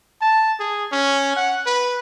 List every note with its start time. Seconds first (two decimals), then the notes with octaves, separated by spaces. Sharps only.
0.22 A5
0.60 G#4
0.92 C#4
1.37 F#5
1.66 B4